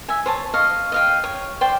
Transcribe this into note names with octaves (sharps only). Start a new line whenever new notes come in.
E5 G#5
C5 C#5 A5
D#5 F5 C#6
D#5 F5 G5
C#5
C5 D5 G5 C6